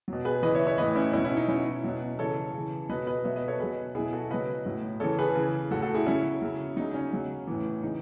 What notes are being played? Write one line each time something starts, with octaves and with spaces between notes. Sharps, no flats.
B2 F#3
G#4 B4
C#3 E3 B4 D#5
C#5 E5
C#5 E5
A2 E3 B4 D#5
C#4 E4
B2 F#3 C#4 E4
C#4 E4
D#4
B2 F#3 C#4 E4
B2 F#3
C#3 E3 A4 C#5
C#3 E3
B2 F#3 B4 D#5
B4 D#5
B2 F#3 C#5 E5
B4 D#5
A4 C#5
B2 F#3 G#4 B4
B2 F#3 E4 G#4
F#4 A4
C#3 F#3 B4 D#5
A2 F#3
C#3 E3 A4 C#5
G#4 B4
C#3 E3
A2 F#3 F#4 A4
F#4 A4
E4 G#4
C#3 F#3 C#4 E4
C#3 F#3
C#3 F#3 D#4
C#4
C#3 F#3
A2 E3
C#3 E3 D#4